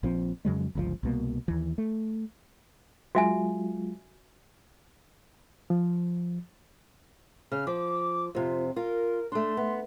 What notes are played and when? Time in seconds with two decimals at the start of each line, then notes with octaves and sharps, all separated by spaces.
0.03 A#1 F3 C4
0.45 F2 C#3 F#3 G#3
0.75 G1 C#2 B2 F3
1.03 C2 B2 A#3
1.48 D#2 E3
1.78 A3
3.15 F#3 G#3 F4 F#4 E5 G#5
5.70 F3
7.52 C#3 F6
7.67 F3 D6
8.35 F2 C3 F4
8.76 F4 A#4
9.32 A3 D4 C6
9.57 B3